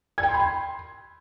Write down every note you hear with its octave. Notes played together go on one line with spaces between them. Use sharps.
G#6
G5
C6
B5
C6